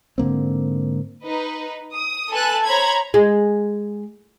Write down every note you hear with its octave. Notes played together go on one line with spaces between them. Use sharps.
G#2 D3 A#3 C4
D#4 B4
D#6
A4 B4 G#5 A5 F#6
C5 C#5 A#5 B5 G#6
G#3